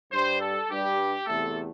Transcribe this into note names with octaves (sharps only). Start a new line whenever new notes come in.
G2 G3 C5
A4
G2 G3 G4
E2 C3 A3 A4